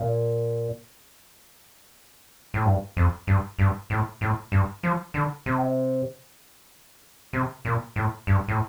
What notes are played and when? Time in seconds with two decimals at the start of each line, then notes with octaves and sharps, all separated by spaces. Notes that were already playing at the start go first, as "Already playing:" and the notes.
Already playing: A#2
2.54 A2
2.65 G2
2.97 F2
3.27 G2
3.59 G2
3.90 A2
4.21 A2
4.52 G2
4.83 F3
5.14 D3
5.46 C3
7.33 C3
7.65 A#2
7.96 A2
8.27 G2
8.48 A2